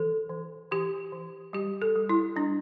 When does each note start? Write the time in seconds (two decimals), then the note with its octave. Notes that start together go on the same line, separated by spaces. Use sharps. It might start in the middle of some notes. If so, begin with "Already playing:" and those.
Already playing: E3 A4
0.30 E3
0.71 E3 G4
1.12 E3
1.53 G3 G4
1.82 A4
1.96 G3
2.09 E4
2.36 G3 D4